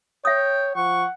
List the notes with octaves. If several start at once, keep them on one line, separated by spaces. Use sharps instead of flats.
C#5 E5 G5 D#6
F3 F#5 C#6